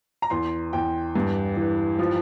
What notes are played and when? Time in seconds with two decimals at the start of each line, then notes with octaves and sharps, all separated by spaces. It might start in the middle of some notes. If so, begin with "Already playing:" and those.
0.22 A#5
0.30 E2 C6
0.73 E2 G5
1.15 G2
1.56 E3
1.99 F3